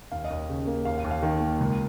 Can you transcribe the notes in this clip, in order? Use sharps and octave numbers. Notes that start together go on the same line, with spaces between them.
D#2 F5
D#5
D#2
C#3
A#3
D#2 F5
F5
D#2
F5
D#3
A#3
C#2